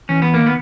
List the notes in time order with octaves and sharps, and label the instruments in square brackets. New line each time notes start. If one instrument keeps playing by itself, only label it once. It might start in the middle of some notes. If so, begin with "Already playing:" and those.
[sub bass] E3 [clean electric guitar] C#4
[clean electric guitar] B3
A#3
[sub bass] D#3
[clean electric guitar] B3